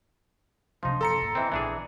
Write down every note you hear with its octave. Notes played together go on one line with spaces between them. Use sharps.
C3 F3 D4 D#4 C6
F#1 A4 A#5 C#7
A#2
E3 C4 D#5
A#1 B2 E3 D4 G#4 D5